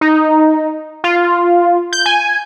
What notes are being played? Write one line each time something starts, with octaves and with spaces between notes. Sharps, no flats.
D#4
F4
G6
G#5